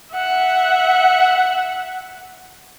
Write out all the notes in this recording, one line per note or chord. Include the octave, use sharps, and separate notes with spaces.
E5 F#5